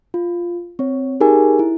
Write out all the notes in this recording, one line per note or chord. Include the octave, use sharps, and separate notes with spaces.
F4
C4 C#5
D#4 G4 G#4 A#4 G#5
E4